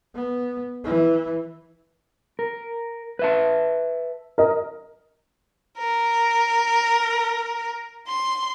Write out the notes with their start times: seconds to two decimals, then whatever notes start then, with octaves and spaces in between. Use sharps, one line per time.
0.15 B3
0.84 E3
2.39 A#4
3.19 B4 E5 A5
4.38 A#4 D#5
5.78 A#4
8.08 C6